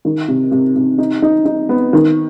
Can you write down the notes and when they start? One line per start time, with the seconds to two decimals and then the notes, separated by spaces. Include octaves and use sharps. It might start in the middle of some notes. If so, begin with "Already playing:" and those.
0.05 D#3
0.28 C3
0.51 C3
0.75 C3
0.98 D#4
1.22 D#4
1.45 D#4
1.69 B3
1.93 D#3